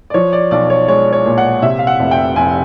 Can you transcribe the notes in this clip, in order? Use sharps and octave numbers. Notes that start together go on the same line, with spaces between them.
D5
F3 C#5
D5
B1 D5
C#5
G#3 C#5
C#5
A#2
F#5
C3 E5
F5
F#5
F1
G5
F1 G#5